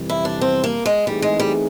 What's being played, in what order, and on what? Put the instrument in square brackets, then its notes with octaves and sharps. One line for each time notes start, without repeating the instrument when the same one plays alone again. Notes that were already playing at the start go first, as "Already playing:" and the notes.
Already playing: [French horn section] F2 C3 E3 G3
[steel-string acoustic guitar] E4
D4
C4
A#3
G#3
[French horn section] E3 A3 C4 D#4 G#4 [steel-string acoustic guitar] G3
[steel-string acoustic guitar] G#3
G3